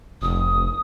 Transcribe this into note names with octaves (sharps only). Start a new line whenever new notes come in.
F1 D#6